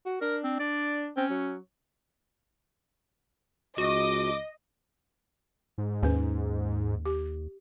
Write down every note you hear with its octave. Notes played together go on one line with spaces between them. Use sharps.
F#4
D4 A#4
C4
D4 D5
C4 C#4
F#3
C#2 F#4 D#5 D6
G#2
D#2 C#4 B4
G4